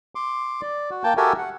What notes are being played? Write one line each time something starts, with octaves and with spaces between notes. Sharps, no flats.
C6 D6
D5
F#4
A#3 G5 A5
F#4 G4 A4 A#4 E5 G#5
F#5